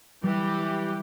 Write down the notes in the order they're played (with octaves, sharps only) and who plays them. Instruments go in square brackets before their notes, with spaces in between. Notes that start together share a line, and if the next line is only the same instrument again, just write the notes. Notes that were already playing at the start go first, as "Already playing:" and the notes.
[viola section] E3 G4 [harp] G3